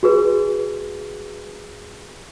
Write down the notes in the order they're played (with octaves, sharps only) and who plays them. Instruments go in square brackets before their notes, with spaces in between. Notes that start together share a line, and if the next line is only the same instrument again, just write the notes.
[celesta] F#4 G#4 B4